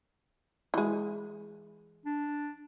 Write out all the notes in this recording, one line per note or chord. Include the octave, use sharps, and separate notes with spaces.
E3 G#3
D4